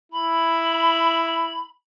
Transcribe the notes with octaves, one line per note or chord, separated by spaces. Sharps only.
E4 B5